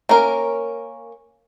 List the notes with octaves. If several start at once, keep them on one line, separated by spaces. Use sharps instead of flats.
A#3 C#4 A#4